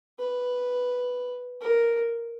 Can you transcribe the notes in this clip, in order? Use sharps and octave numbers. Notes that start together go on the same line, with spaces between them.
B4
A#4